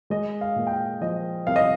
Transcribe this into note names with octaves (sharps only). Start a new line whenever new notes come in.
G#3 D#5
F5
A#2
G5
F5
F3 D#5
C2 F5
D#5